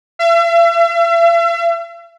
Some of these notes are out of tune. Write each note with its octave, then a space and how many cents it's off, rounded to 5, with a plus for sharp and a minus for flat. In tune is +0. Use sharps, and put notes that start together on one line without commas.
E5 +45